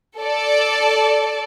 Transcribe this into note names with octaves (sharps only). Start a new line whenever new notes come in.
A4 D5